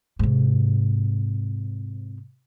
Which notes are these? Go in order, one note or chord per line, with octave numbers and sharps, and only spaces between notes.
G#2 C3